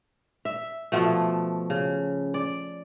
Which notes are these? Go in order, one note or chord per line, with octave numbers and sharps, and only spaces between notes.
E5
B2 F3 A3
C#3
D5